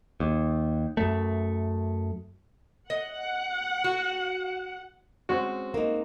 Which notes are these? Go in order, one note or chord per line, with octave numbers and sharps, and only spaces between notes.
D#2
F#2 A3
D#5 F#5
F#4
G#3 C4 C#4 F#4
A#3 D#4 E7